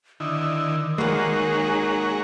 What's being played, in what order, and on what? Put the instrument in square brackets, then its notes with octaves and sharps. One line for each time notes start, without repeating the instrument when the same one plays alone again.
[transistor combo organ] D3 D#4 E4 [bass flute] D#3
[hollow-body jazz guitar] G#3 A#3 [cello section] D#4 G#4 [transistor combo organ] F#4 A#4 C#5